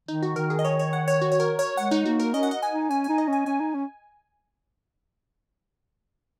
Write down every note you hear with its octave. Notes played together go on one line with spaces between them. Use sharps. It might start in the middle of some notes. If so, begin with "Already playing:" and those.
D#3 D#4
F#4
D#3 A#4
G#4
D#5
C#5
C#5
F#5
C#5
F#4
C#5
A#4
C#5
G#3 F#5
D#4
A#3 F#4
A#4
C#4 D#5
F#5
D#5
G#5
D#4
C#4 G#5
D#4 G#5
D#5
C#4 G#5
C#4 G#5
D#4
C#4